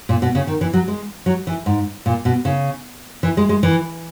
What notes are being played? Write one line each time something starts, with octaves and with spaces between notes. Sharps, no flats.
A#2
B2
C#3
D#3
E3
F#3
G#3
F#3
E3
G#2
A#2
B2
C#3
E3
G#3
G#3
E3